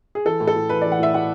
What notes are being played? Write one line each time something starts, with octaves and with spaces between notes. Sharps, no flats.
G#4
E3 A4
A2
A4
A2
E3 B4
E3 D5
F#5
A2 E5
A2 F#5